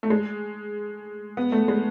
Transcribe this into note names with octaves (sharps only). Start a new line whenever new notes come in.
A3
G#3
B3
A3
G#3